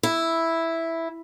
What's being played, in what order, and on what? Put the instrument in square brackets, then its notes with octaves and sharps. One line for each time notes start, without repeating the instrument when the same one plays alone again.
[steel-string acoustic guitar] E4